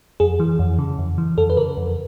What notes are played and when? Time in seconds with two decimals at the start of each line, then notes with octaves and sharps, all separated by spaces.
0.20 F2 G#4
0.40 E3
0.59 F2
0.79 C#3
0.98 F2
1.18 E3
1.38 F2 A4
1.50 B4
1.57 C#3 A#4
1.77 F2